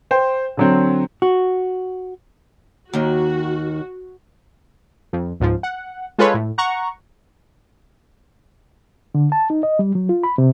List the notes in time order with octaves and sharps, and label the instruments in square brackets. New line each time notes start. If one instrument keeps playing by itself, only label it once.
[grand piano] C5 G5
D3 F#3 C4
[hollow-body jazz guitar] F#4
[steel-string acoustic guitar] D#2 D#3 [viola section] F#4
[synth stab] F2
C#2 G#2 F3
F#5
G#3 F4 A4 B4 C#5
A2
F#5 A#5 C#6
[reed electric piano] D3
A5
D#4
D#5
G3
F#3
F4
B5
C3